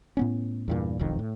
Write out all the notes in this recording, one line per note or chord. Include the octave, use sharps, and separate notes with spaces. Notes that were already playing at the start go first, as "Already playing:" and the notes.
A2 B3 C#4
E2 G2 A#2
E1 B1 F2 D#3
A2